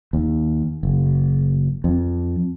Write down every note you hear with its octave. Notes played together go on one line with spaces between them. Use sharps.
D#2
F#1
F2